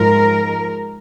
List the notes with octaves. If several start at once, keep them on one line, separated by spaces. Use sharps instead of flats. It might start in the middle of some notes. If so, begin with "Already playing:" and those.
Already playing: G#2 F3 G#3 A#4